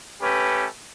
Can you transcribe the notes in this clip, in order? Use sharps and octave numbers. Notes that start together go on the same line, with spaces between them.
A3 C#4 G4 B4